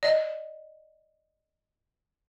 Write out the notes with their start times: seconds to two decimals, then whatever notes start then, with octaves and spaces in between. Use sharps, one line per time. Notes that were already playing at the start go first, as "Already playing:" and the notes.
0.03 D5 D#5